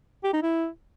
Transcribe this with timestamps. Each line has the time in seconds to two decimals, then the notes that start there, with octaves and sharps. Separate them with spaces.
0.24 G4
0.33 D#4
0.42 E4